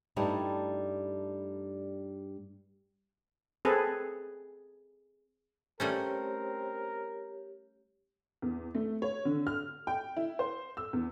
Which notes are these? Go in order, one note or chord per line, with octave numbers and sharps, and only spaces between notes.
G2 G3 A3 D#4 E4
C4 G#4 A4 B4
G3 A3 C4 C#4 G4 A#4 C#5
E2
A3
C#5
D3
F6
G5
E4
C5
E6
E2